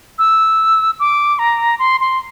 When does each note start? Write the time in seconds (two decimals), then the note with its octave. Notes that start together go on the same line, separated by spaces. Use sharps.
0.19 E6
1.00 D6
1.39 A#5
1.79 C6
2.00 C6